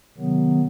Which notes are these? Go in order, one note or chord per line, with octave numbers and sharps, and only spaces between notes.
C3 D#3 F#3 B3